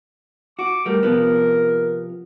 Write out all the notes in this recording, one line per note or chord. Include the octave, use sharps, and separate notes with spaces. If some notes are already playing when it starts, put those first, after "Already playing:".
F#4 D6
G3 A3 A#4
C3 F3 B3